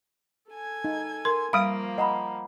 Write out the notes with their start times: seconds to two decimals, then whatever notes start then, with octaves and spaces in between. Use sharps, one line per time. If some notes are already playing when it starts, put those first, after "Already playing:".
0.51 A4 G#5 G#6
0.84 D#4
1.25 A#4 C6
1.53 F3 G3 A#3 F5 B5 D#6 D7
1.98 D#5 F#5 A#5 B5